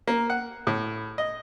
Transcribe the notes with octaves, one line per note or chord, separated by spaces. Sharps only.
A#3
F#5
A2
D#5